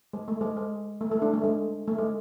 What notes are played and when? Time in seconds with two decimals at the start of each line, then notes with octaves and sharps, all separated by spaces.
0.13 G#3
0.28 A3
0.41 G#3
0.57 G#3
1.01 A3
1.11 A3
1.22 D4
1.33 A3
1.44 G#3
1.88 A3
1.98 G#3